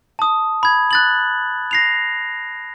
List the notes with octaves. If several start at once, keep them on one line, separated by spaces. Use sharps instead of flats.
A5 D#6
B5 G#6
F#6 A6 F#7
A#6 C7 F7